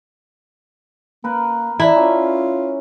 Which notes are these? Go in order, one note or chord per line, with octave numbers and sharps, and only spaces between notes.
A#3 A#4 B4
E3 D4 E4 A#5
C#4 F4